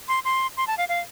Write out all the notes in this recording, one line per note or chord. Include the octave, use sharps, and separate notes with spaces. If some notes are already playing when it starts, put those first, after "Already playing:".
C6
C6
C6
A5
F5
F5